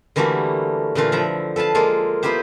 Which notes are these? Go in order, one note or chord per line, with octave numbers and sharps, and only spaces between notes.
D3 E3 G3 A3 A#3 F#4
A#2 D3 E3 A3 F4
F3 E5 A#5 B5
A4 B4 F5 A5
G#3 A#3 F4 A4
B3 E4 F4 G4 C5